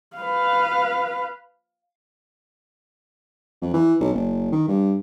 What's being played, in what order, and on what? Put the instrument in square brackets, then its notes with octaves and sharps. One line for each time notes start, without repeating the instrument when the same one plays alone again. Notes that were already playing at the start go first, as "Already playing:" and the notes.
[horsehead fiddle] B4 F5
[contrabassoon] F2
E3
B1
F#1
D#3
G2